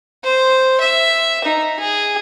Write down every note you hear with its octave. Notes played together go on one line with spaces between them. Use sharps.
C5
E5
D#4
G#4